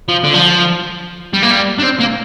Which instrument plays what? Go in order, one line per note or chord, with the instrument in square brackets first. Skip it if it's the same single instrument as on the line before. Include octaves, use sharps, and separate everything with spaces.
[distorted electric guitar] F3
D3
F3
G3
A#3
G3
D4
C4
A#3